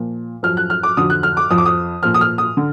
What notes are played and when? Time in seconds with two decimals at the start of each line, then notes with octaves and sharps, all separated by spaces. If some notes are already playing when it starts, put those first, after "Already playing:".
Already playing: A#2 F3
0.43 F#2 F3 F6
0.57 F#6
0.70 F6
0.83 D6
0.97 F2 D3 F#3 D#6
1.10 F#6
1.23 F6
1.37 D6
1.50 F2 F3 D#6
1.58 D6
1.65 D#6
2.03 A#2 F3 F6
2.14 D#6
2.21 F6
2.38 D#6
2.57 D3